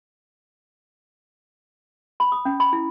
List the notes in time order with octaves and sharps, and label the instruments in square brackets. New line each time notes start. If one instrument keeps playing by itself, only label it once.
[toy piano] B5
D#6
C#4
B5
E4